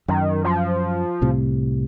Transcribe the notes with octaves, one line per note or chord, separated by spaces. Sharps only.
F#2 D#3
F3
C2 A2 C3